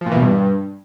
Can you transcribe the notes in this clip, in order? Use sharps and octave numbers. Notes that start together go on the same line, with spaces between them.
F3
A#2
E3
B2
G2